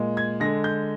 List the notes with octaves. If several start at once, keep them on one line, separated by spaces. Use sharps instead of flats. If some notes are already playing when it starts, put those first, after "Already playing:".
Already playing: A#2 G#3
G#6
D3 G#3 A#6
G6